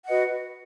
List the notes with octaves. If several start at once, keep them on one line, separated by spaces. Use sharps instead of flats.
F#4 B4 D#5 F#5